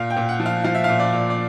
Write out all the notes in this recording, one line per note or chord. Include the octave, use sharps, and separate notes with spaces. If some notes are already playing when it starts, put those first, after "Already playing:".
Already playing: A#2 F5
G5
A#2
F#5
F3
F5
F3 F5
E5
A#2 F5
D5
A#2
D5